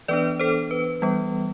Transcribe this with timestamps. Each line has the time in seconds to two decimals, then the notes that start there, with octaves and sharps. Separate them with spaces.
0.08 E3 B3 D4 B4 D5
0.39 A4 C5
0.71 B4
1.02 E3 G3 B3